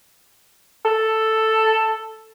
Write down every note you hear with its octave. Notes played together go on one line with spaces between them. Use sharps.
A4